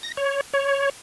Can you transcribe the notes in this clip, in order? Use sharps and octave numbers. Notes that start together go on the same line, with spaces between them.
A#6
C#5
C#5